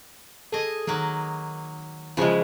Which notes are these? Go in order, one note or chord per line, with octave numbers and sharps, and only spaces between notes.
G#4 A4 D#5
D#3 F#3 A#3
C#3 E3 F3 G#3